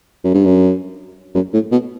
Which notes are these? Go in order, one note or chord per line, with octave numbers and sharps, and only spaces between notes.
F#2
G2
F#2
F#2
A2
B2